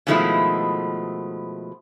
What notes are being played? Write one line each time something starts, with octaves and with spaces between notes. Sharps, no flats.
B2 D#3 F3 G#3 A3 E4